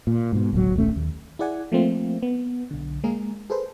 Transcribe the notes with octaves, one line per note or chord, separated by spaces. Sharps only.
A#2
G#2 B2
D1 B1 C3 F#3
D#1 B1 A3 C#4
D#2
E4 G#4 D5 F#5 G#5
F3 A3 A#3 C4 F4
B3
B1 D3
G#3 A#3 G#4 A#4
G#4 A4 B4 C5